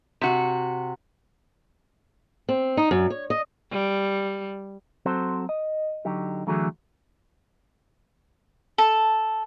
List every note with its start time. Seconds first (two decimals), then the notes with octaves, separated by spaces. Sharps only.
0.21 C3 F#4
2.49 C4
2.77 D#4
2.91 F#2
3.10 C#5
3.30 D#5
3.72 G3
5.06 F#3 C4 F#4 A4 C5
5.49 D#5
6.05 D3 F#3 D#4 G4
6.47 D3 E3 F#3 A3 F#4 G#4
8.78 A4